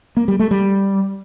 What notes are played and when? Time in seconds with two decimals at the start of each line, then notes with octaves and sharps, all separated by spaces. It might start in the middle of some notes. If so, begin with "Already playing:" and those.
0.17 A#3
0.28 G3
0.39 A3
0.51 G3